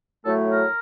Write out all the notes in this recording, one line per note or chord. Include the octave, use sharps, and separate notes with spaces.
A2 F#3 A3 A4
A#4